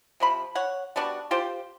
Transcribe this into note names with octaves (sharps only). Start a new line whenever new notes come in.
C3 F3 B5
C#5 F#5
G3 B3 D4 F#4
F4 G4 C5 G5